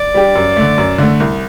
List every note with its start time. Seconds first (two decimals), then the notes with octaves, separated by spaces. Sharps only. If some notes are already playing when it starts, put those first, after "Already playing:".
Already playing: D5
0.14 G3 D4 G4
0.35 F#2
0.56 D3 A3
0.78 F#2
0.98 D3 A3
1.20 C2